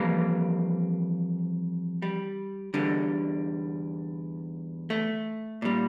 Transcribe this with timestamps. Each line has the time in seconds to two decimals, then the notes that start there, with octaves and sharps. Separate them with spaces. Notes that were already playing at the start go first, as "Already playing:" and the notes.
Already playing: F2 E3 G3 A#3
2.02 G3
2.74 E2 D3 G3
4.90 A3
5.62 A#2 G3